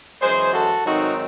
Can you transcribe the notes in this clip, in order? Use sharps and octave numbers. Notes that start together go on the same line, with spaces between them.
F#2 E3 G#3 G#4 C5
F#4 A4
G#2 D#3 F#3 A3 C4 D#4 F#4